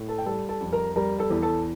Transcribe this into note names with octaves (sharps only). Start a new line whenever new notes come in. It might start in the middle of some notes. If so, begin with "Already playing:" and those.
Already playing: A2
A4 A5
G5
G3 A4 A5
A4 A5
F2
A#4 A#5
G3 A#4 A#5
A4 A5
E2
A4 A5